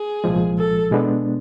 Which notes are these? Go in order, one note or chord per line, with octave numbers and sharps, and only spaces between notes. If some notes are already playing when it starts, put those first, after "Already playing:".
Already playing: G#4
C2 A#2 F3 G#3
A4
B2 G#3 B3 D4